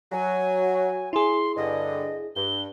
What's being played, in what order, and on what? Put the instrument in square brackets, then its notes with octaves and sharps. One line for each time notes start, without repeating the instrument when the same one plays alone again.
[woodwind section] F#3 [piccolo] G#5
[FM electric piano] E4 G#4 [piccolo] C6
[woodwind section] G2 D3 [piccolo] D#5
[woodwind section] G2 [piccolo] G7